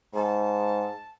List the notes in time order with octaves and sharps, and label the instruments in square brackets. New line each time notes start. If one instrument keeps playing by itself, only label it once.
[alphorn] G#2 [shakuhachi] A5